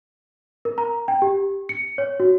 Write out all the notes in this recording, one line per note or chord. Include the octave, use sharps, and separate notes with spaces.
A#4
A#5
G5
G4
C#7
C#5
F#4